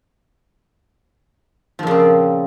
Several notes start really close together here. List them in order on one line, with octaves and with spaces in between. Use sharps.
F3 A#2 C#3 C4